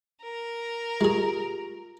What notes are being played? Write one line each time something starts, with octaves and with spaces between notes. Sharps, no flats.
A#4
G#3 F4 G4 G#4 A#5